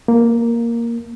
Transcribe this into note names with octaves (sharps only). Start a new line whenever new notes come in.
A#3